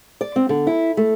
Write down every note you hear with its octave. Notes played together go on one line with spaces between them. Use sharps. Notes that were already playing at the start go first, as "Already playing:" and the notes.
D5
C4
D3
E4
A3